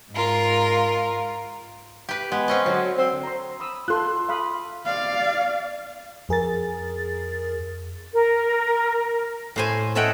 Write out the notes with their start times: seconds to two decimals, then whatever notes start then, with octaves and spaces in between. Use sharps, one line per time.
0.13 G#2 F4 A#4
2.09 G4 B4
2.32 G#3 B3
2.48 C4 C#4 D#5
2.66 D3 F#3
2.98 C4
3.23 A#5 C6
3.60 B5 D#6 E6
3.88 F4 A4 C6 F#6
4.29 F5 B5 D#6
4.86 D5 F5
6.29 F2 G#4 A#4 A6
8.13 A#4
9.56 A2 C5 G#5
9.95 A4 C#5 D#5 E5 F#5 G5